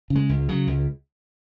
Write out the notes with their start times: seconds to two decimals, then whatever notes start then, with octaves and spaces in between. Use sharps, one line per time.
0.10 C#3
0.15 G#3
0.29 C#2
0.48 C#3 F#3
0.67 C#2